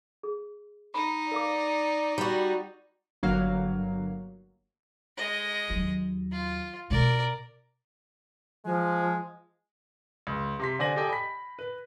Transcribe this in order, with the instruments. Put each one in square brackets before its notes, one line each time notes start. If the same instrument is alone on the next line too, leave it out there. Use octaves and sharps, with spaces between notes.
[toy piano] G#4
[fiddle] D#4 [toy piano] B5
[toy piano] A#4 F5 D6 [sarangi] D5
[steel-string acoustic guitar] G3 F#4 [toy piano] B5
[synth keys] G1 F#3 A#3 F5
[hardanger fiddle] G#3 D#5
[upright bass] D#2 F#3
[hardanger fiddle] F4
[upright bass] B2 C4 [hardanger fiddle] A#4 D5
[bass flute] F3 [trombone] G#3
[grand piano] C#2
C3 C6 B6
D3 C5 D5 G#5 A#6 F#7
G4 A4 D5 D#5 G5 G#5
B5 B6
B4